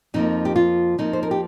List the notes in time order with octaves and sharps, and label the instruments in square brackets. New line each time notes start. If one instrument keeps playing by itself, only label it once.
[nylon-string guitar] F2 F3 A#3 D#4
G4
F4
F2 F3 A#3 D#4
C5
A#4
G4